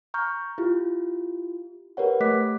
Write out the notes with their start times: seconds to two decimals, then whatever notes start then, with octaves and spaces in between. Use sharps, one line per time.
0.14 A#5 C#6 F6 G6
0.58 E4 F4 G4
1.97 G4 A#4 B4 C#5 F#5
2.20 A3 G4 D#5 D6 F#6 B6